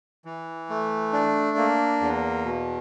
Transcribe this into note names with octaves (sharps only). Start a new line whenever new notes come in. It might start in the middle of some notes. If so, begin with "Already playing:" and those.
E3
A3
D4
A#3
E2
B2